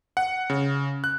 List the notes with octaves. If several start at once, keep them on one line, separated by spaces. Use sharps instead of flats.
F#5
C#3
F#6